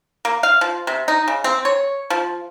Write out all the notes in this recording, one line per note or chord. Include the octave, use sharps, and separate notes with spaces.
A#3
F5
F3
C3
D#4
C#3
C4
C#5
F3